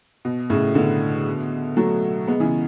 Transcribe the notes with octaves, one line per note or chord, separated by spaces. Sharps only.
B2
A2 C#3
B2 D3
F#3 A3
G#3 B3
C#3 E3